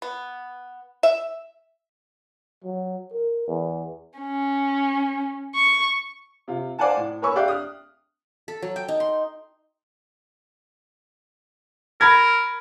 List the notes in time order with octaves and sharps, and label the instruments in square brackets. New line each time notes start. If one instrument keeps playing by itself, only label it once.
[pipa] B3
E5
[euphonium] F#3
A#4
E2
[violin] C#4
C#6
[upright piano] C3 F4
C5 D5 F5 F#5 G#5 A5
A2
A#4 C#5 G#5 B5 C#6 E6
G4 D5 E5 F5 G5 F#6
D#6 F6
[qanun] A4
F#3
G5
D#4
C6
[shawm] A#4 [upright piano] A#5 B5 G#6